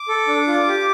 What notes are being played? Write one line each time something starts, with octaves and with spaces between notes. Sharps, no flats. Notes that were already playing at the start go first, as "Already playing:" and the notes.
Already playing: D6
A4
D4
F4
G4